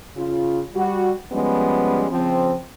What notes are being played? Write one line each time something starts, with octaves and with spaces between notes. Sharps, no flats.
C#3 F4
G3 F#4
F3 G3 G#3 B3 C#4
C#3 F3 C4